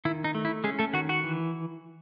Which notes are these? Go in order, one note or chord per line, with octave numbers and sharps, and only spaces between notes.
D#3 E4
D#4
A3
E4
G#3 C#4 G#4
A3 A4
D#3 F#4 F#5
F#4 F#5
E3